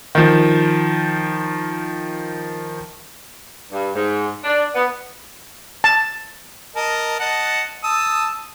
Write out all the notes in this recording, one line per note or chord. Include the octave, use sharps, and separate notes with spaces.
D#3 F3
G2
G#2
D4
B3
A5
A#4 D#5 A5
D#5 F#5 A5
A5 D#6 E6